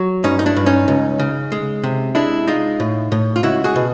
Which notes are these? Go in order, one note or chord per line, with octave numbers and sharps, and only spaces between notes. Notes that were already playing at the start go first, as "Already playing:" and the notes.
Already playing: F#3
G2 C#4 D#4
D#4
D4 E4
G2
C#4 D#4
C#2
C#3
G#3
C3
G#3 D4 E4
G#3 D#4 F4
A2
A2
F4
C#2 E4 F#4
F#4 G#4
B2